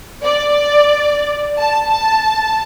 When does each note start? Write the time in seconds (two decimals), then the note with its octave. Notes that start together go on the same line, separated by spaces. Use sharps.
0.24 D5
1.58 A5